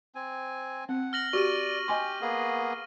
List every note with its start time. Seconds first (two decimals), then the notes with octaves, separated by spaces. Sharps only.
0.15 C4 G#5
0.89 C4 F#5
1.13 F6 A#6 F#7
1.33 F#4 G4 D5 C#6 D#7
1.88 G4 D#5 G#5 C6
2.21 A#3 B3 G#4